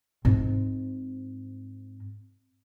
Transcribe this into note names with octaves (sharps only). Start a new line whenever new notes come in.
G#2 C4